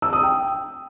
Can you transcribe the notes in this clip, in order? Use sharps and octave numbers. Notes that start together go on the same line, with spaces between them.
E6
D#6
G5